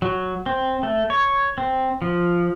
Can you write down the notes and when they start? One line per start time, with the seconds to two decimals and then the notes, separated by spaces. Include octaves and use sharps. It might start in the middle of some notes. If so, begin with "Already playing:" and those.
0.02 F#3
0.46 C4
0.83 A3
1.10 C#5
1.58 C4
2.02 F3